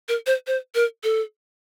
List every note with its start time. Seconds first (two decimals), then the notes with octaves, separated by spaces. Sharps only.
0.09 A#4
0.27 C5
0.47 C5
0.75 A#4
1.04 A4